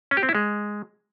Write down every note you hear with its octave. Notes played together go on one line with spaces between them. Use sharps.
C#4
G4
C4
E4
G#3